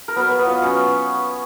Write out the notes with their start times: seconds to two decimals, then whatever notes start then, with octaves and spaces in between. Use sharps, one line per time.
0.08 A#4
0.16 F#3 B3 B4
0.32 F#3
0.39 B3 B4
0.46 F4 D#5
0.62 F#3 C#4 C#5